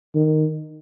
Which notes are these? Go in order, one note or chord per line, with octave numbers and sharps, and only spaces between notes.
D#3